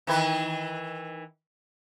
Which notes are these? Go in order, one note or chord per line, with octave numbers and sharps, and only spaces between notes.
D#3 E3 B4